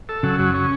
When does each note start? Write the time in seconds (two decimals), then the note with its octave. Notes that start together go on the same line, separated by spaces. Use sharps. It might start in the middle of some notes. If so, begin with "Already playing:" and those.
0.09 A4
0.23 C#3 F#3
0.39 F#2
0.54 C#4